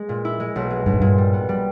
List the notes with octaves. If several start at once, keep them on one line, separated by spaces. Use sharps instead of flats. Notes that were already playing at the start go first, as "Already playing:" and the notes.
Already playing: G#3
A#2
E4
G#3
B1
G#3
B1 G2
G#2
G2 A#2
G3
B3
G3